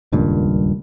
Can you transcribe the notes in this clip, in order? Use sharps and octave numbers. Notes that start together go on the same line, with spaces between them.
D#1 C#2 G2 A#2